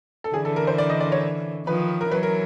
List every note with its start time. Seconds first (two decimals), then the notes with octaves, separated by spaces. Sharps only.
0.24 A4
0.34 D3 E3 G#4
0.45 A4
0.56 A#4
0.67 C5
0.78 D5
0.90 D#5
1.00 D5
1.12 C#5
1.67 D#3 F3 B4
2.01 A#4
2.11 E3 F#3 B4
2.23 A#4